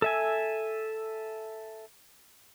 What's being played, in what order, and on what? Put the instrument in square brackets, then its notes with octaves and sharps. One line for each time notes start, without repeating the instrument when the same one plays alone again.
[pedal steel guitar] A4 E5 G#5